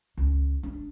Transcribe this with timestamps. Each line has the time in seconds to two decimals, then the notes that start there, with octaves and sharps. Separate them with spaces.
0.17 C#2
0.63 D4